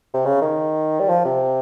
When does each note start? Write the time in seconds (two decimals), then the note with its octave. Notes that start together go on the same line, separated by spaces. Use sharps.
0.14 C3
0.25 C#3
0.42 D#3
1.00 G3
1.08 F3
1.25 C3